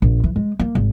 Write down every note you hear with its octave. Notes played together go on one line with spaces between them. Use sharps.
A#1
E3
G#3
A#3
G#1